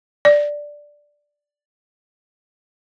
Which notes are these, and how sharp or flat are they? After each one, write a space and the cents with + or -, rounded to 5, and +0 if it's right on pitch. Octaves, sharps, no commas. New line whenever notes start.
D5 +0